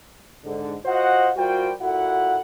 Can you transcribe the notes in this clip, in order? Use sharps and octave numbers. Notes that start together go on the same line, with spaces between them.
G#2 D3
F4 F#4 C5 D#5 F#5
G3 F4 F#4 A#4 C5 G5
A#2 E4 F#4 A4 F#5